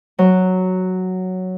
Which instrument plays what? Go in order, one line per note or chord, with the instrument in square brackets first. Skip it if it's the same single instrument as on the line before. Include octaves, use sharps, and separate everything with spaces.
[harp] F#3